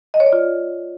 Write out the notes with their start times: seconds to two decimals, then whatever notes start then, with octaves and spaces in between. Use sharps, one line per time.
0.14 D#5
0.20 C#5
0.26 D5
0.33 F4